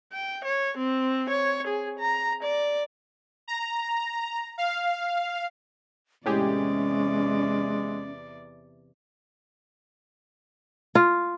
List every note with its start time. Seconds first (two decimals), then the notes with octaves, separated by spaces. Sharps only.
0.13 G5
0.45 C#5
0.77 C4
1.30 C#5
1.67 G#4
1.99 A#5
2.43 D5
3.48 A#5
4.58 F5
6.26 E2 A2 C3 G#3 C#4 G4 G#4 D5
10.95 F4